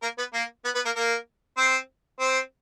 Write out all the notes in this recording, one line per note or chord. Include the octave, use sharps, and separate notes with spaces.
A#3 A#4
B3 B4
A#3 A#4
B3 B4
B3 B4
A#3 A#4
A#3 A#4
C4 C5
C4 C5